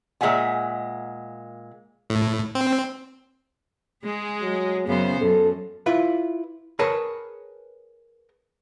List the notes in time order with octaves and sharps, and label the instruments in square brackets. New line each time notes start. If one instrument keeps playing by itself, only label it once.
[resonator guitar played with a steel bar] A#2 G#3 E5 F#5 G#5
[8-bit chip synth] A2
C4
[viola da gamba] G#3 G#4
[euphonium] F#3
[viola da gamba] F#2 B3 C5 [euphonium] C#3
[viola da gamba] F#2 [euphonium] A4
[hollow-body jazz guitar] E4 F4 B4
G#4 A#4 B4 C#5 A5